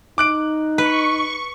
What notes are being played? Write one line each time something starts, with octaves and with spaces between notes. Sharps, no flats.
D#4 D6 F#6 D7
B4 C#6